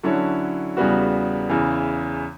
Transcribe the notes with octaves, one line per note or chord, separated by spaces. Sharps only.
D3 F#3 C#4 E4 A4
E2 C#3 G3 B3 F#4
E2 C#3 E3